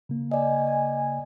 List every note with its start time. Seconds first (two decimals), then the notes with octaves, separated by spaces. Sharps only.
0.09 C#3 A#3
0.32 D5 D#5 G#5